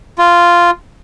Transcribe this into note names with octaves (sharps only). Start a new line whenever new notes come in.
F4